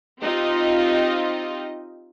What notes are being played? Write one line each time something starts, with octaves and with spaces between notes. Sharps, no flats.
C4 D#4 F4 G4 D#5